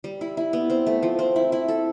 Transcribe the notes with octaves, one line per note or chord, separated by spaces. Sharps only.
G3
E4
E4
B3
C4
A3
F3
C4
E4
E4
A4